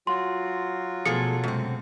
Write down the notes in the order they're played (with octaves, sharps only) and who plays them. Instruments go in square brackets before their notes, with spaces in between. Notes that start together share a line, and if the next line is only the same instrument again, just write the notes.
[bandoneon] F#3 F4 F#4 [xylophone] C6
[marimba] B2 A3 B3 [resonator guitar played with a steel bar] F3 G#4 A4 [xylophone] C#7
[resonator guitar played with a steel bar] F#2 C4 [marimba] C3 G#3